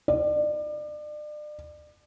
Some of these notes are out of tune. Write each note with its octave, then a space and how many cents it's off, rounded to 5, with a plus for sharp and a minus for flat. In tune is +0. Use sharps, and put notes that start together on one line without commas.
D5 +35